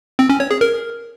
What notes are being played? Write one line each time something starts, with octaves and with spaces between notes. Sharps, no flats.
C4
C#4
C#5
G#4
A#4